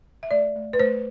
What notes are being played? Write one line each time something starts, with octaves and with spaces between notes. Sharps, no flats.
E5
A3 D5
A3
B4
A3 C5